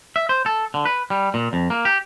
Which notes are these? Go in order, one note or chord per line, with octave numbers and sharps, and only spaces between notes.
E5
C5
A4
D3
B4
G3
A#2
F2
A#3
G4